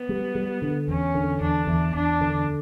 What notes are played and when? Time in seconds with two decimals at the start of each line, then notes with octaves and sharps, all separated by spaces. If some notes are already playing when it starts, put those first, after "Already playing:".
Already playing: B3
0.09 G3
0.35 G3
0.62 D3
0.88 E2 C#4
1.15 D3
1.41 E2 D4
1.67 E2
1.94 E2 D4
2.21 D3